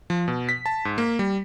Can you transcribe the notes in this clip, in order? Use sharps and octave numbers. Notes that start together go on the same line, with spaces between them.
F3
B2
B6
A5
G#2
A#3
G3